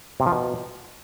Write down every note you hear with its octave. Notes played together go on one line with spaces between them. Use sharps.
C3
F3
B2